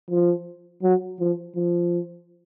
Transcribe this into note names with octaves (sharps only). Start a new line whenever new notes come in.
F3
F#3
F3
F3